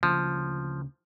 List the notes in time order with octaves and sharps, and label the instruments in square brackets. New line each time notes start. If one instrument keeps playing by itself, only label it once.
[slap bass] D2 C#3 A#3 [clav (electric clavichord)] F3